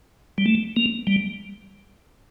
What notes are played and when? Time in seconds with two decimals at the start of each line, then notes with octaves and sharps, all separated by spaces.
0.38 G3
0.46 A3
0.76 A#3
1.07 G3